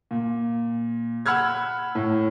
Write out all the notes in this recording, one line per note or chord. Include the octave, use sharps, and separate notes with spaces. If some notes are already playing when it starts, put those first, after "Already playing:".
A#2
F#5 B5 E6 F6 G#6
A2